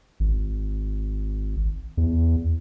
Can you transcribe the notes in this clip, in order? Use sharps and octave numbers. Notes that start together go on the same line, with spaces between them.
G#1
E2